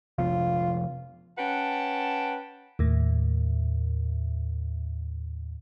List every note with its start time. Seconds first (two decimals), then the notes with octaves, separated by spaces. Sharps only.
0.18 C3 F3 B3 F4
1.38 C#4 B4 F#5 G5 A5
2.79 D#2 A2